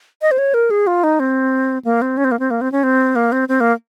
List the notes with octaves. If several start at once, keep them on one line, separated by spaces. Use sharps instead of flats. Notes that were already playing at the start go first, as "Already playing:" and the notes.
D#5
C5
C#5
A#4
G#4
F4
D#4
C4
A#3
C4
C#4
C4
A#3
C4
A#3
C4
C#4
C4
A#3
C4
C4
A#3